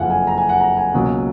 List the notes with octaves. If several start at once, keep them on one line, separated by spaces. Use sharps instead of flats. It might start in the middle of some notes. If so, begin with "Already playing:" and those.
Already playing: F#1 F2 F3 F5 F#5 G#5
G#5
A#5
G#5
F#5
A#5
G#5
C#2 B2 F#3 A#3 C#4